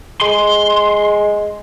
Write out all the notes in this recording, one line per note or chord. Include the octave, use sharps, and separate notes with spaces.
G#3 C6